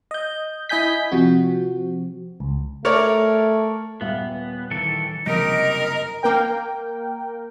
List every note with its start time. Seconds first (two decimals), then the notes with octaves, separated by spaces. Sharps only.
0.11 D#5 G6
0.69 E4 D#5 G#5 G6 B6
1.12 C3 F3 C4 F#4
2.40 C#2
2.85 A3 A#4 C#5 D5
4.01 D#1 B3 E5 F5
4.71 D#3 E3 A4
5.26 F#1 C2 D#4 G4 A#4 D#5
6.23 A#3 A#4 G5